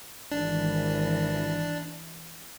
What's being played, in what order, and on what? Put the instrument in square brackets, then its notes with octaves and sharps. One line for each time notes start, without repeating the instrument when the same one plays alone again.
[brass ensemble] G#1 [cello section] E3 [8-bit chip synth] D4